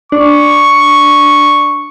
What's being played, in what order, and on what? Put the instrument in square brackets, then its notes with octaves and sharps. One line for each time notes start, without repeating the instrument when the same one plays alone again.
[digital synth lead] D4 [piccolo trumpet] C#6